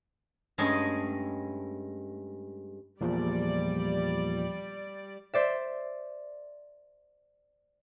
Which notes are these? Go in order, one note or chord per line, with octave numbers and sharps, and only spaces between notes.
G2 G#3 A3 C#4 D#5 G#5
E2 A#2 F3 G3 D5
C5 D5 E5